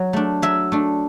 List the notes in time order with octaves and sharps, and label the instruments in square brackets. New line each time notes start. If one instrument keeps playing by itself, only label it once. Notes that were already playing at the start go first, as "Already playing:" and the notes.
Already playing: [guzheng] F#3
A3 D4
F#3 E5
A3 D4